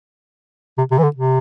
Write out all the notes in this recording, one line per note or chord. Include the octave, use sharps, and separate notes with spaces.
C3
C3
E3
D3
C3